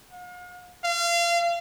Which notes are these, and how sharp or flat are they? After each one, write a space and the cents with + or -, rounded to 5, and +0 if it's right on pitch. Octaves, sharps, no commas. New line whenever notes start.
F5 +45
F5 -30